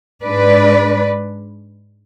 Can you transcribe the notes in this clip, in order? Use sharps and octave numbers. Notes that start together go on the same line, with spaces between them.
G#2 G#3 D4 B4 D5